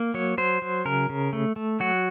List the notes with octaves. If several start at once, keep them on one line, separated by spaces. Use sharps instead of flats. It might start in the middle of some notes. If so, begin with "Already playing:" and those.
Already playing: A#3
F#3 C#5
F#3 C5
F#3
C#3 A#4
C#3
A3
A3
F#3 F#4